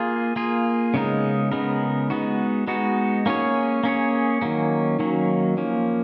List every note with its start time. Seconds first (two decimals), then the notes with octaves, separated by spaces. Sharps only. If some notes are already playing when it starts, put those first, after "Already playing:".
Already playing: A#3 F4 G#4
0.36 A#3 F4 G#4
0.94 C#3 G#3 B3 D#4 A#4
1.52 C#3 G#3 B3 D#4 A#4
2.10 G#3 B3 D#4 F#4
2.67 G#3 B3 D#4 F#4
3.26 A#3 C#4 G#4 C#5
3.83 A#3 C#4 G#4 C#5
4.41 D#3 F#3 A#3 C#4
4.99 D#3 F#3 A#3 C#4
5.57 F3 A#3 C#4